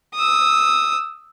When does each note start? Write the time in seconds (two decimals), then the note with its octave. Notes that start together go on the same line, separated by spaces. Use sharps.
0.15 D#6 E6